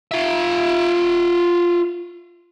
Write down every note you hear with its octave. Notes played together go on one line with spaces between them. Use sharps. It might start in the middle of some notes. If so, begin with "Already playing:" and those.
F4 E5